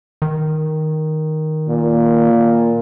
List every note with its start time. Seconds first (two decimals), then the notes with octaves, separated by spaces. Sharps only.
0.22 D#3
1.69 A#2